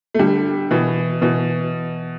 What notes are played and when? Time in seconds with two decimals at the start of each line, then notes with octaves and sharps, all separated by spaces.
0.15 A3
0.19 D3 G3
0.71 B2 E3
1.22 B2 E3